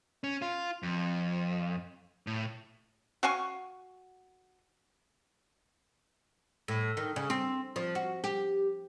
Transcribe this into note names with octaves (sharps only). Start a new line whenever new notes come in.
C#4
F4
F2
A2
F#4 F5 G#5 C#6
A2
D#3
C#3
C4
F3
F#4
G4